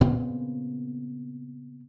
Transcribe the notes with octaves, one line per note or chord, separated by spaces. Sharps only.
A#2 C#3 B3 C4